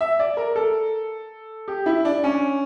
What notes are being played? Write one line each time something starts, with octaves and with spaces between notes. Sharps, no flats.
E5
D5
A#4
A4
G4
E4
D4
C#4